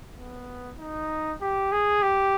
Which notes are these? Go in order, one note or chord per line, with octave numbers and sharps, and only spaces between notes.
B3
D#4
G4
G#4
G4